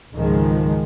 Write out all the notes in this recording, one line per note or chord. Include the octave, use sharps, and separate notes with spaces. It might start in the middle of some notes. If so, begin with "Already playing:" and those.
C#2 G#2 D#3 F3 G#3